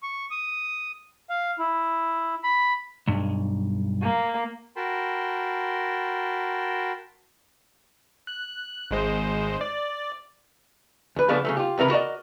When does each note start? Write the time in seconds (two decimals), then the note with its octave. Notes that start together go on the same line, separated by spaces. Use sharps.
0.03 C#6
0.31 D#6
1.30 F5
1.59 E4
2.44 B5
3.07 B1 G2
4.03 A#3
4.76 F#4 A#4 G5 A5 B5 C6
8.27 F#6
8.91 G#1 G#3 C5
9.61 D5
11.16 D2 B4
11.28 C#3 F3 A3 B3 D4
11.45 C#3 F#3 A3
11.57 F4 G4
11.78 C#2 C3 E3 A#4 B5
11.90 F#4 A#4 D5 D#5